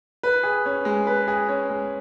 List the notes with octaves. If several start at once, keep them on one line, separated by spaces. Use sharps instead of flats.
B4
G#4
C#4
G#3
B4
G#4
C#4
G#3